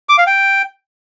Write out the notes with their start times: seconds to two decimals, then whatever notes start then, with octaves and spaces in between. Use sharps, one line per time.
0.09 D6
0.18 F5
0.27 G5